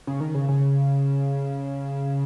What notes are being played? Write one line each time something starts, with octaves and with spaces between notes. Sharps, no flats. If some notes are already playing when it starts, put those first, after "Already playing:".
C#3
D#3
C#3
C#3